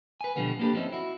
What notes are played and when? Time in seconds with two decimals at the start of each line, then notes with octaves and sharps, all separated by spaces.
0.21 B4 G#5
0.36 B2 D3 F3 G3 B3
0.59 A#3 B3 D4 G4 A4 B4
0.73 F3 C4 C#4 D#4 E4
0.93 E4 F#4